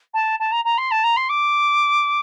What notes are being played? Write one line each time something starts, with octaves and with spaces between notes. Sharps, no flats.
A5
A5
A#5
A#5
C6
A5
A#5
C6
D6